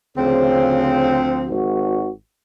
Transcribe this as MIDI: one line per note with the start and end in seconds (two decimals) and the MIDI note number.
0.17 1.60 38
0.17 1.23 49
0.17 1.60 53
0.17 1.60 60
0.17 1.23 72
1.48 2.09 32
1.48 2.09 66